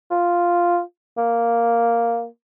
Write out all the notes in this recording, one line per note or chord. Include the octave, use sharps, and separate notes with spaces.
F4
A#3